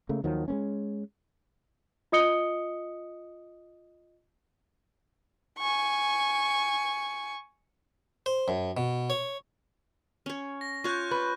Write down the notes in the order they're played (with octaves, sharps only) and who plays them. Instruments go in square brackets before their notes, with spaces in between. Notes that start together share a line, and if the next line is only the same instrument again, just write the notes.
[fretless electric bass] C#3 A3 A#3
D#2 D#3 F3 F#3
G#3 A#3 C#4
[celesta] F4 D#5 D#6 C#7 G7
[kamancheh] G#5 C#6
[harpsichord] C5
F#2
B2
C#5
[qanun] C#4 C#5
[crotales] A#6
[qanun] F4 C#5 [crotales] C#6 F#6 G6
[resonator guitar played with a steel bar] B4